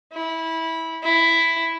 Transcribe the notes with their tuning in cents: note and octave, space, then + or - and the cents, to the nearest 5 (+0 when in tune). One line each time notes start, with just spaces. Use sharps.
E4 -20
E4 +5